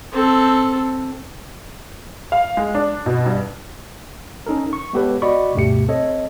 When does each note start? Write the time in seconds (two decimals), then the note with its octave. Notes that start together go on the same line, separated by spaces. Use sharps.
0.13 C4 A4
2.32 F5
2.57 G#3
2.75 D4
3.06 B2
3.26 G2
4.46 C#4 D#4 A4 A#4
4.73 C#6
4.93 G#3 B3 G4 A4 B4 C#5
5.22 F#4 D5 D#5 B5 C#6 D6
5.55 D2 G2 B2 A3 G4 C#7
5.88 C4 A4 C#5 D#5